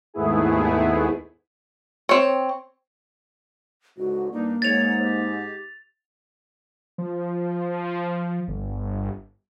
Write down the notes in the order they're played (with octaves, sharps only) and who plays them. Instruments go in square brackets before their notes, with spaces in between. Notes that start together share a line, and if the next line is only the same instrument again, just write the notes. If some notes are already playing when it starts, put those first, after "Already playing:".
[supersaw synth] D#2 G#2 A3 B3 E4 G#4
[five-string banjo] C4 C#5
[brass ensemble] C#2 G#2 D3 [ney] F#4
[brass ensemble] G2 D4 [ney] A#3 [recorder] D#4
[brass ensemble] G#2 [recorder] C#5 [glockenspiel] A6 F7
[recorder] G4
[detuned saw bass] F3
G1